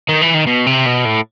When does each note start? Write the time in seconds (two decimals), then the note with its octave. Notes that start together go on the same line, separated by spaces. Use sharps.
0.09 D#3
0.22 E3
0.35 D#3
0.47 B2
0.66 C3
0.86 B2
1.05 A2